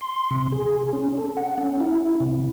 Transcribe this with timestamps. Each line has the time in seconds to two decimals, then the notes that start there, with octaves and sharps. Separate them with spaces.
0.01 C6
0.31 C3
0.52 G#4
0.93 C#4
1.17 A4
1.37 F#5
1.58 C#4
1.80 E4
2.20 C3